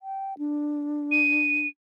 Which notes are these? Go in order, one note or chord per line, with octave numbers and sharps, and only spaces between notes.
G5
D4
D#7